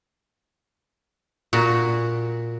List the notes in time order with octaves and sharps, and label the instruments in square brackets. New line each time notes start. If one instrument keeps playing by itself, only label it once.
[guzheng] A#2 F#4